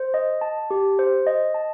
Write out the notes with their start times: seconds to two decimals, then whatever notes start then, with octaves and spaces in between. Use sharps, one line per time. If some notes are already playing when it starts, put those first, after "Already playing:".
Already playing: C5
0.14 D#5
0.41 A5
0.71 G4
0.99 C5
1.27 D#5
1.54 A5